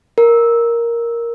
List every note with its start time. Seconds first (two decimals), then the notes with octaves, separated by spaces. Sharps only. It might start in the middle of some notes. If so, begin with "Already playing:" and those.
0.18 A#4